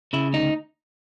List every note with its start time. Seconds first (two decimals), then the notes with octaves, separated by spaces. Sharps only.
0.13 C#3 E4
0.33 D2 D#4